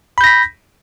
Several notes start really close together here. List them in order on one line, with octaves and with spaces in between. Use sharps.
B5 G6 A#6 B6